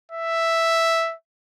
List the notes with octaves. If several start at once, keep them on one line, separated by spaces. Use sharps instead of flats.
E5